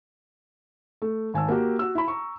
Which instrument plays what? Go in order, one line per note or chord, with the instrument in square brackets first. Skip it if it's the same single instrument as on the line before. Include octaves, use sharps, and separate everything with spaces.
[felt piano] A3
G#1 G#5 A5 E6
A#3 F#4 G4
F#4 E6
E4 B5
A#5 C#6